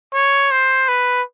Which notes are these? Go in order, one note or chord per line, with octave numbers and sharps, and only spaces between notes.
C#5
C5
B4